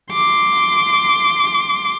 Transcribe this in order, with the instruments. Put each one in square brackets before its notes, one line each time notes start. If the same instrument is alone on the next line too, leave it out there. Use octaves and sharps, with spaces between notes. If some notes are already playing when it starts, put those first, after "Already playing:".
[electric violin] C6 D6